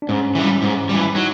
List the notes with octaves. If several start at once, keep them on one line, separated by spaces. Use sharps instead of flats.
D4
G#2 C#4
E3 G3
G#2
E3 G3
F#3 D#4